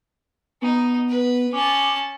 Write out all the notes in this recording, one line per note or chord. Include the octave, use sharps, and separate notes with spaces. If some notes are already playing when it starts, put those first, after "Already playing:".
B3 D#4
B4
C#4 A5 D6